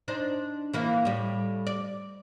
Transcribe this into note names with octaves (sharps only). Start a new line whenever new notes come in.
D4 D#4 C5
E3 A#3 E4
A2 G3
D5